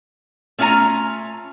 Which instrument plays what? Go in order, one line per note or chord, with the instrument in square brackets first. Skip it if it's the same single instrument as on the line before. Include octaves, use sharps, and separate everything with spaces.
[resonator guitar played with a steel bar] A3 C#4 F4 G#5 A#5